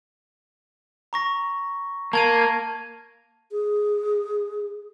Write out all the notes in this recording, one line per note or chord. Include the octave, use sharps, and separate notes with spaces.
A#5 C#6 A#6
A#3 A5 G#6 D#7
G#4